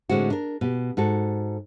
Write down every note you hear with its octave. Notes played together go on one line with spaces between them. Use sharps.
A2 D3 G#3 C4 F#4
D4 A#4
B2 G4
G#2 F#4 A4